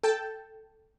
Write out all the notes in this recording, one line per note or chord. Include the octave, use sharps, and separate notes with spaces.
A4 G5 A5